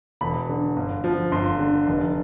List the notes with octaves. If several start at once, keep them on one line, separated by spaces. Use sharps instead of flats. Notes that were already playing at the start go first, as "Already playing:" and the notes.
E1 B5
D3
G1
F3
G1 C6
D3
F1